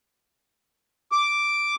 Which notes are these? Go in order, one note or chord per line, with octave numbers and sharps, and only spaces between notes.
D6